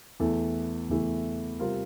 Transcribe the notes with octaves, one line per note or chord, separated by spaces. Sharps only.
E2 E3 A3 E4 A4
E2 E3 A3 E4 A4
C3 G3 C4 F4 A#4